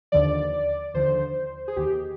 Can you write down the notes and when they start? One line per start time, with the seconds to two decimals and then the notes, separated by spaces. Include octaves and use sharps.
0.12 D#2 D3 F3 D5
0.94 D#2 D3 F3 C5
1.68 G#4
1.76 D#2 D#3 G4